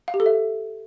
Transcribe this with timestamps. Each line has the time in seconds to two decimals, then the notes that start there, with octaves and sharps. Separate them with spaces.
0.08 F5
0.14 G4
0.20 A4
0.26 E5